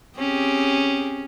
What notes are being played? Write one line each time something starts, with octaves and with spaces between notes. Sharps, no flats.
C4 C#4 G4 G#4